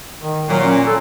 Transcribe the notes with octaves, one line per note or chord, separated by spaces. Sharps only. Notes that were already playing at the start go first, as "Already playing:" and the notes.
D#3
A#2 F#3
C#4
A4